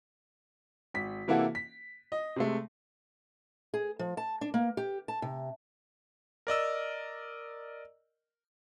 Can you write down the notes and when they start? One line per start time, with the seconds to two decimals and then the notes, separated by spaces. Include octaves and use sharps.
0.94 G#1 B6
1.28 C3 E3 A#3 E4 F#4 A4
1.55 B6
2.12 D#5
2.36 C3 G#3 A3
3.74 G#4
3.99 F3
4.17 A5
4.41 D4
4.54 A#3
4.77 G4
5.08 A5
5.22 C3
6.47 A#4 D5 D#5 E6